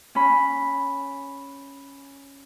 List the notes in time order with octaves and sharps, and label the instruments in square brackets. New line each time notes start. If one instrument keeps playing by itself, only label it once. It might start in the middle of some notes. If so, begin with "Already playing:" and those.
[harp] C#4 B5